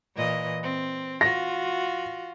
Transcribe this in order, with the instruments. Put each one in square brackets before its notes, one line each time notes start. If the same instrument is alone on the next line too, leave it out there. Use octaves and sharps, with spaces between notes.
[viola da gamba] A#2 E3 D#5
C4
[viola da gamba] F4 F#4 [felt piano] A#6